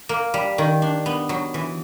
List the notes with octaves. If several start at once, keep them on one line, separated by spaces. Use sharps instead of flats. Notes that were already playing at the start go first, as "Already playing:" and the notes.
A#3
G3
D#3
D4
B3
F#3
E3